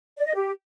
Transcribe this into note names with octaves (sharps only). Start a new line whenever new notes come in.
D5
D#5
G4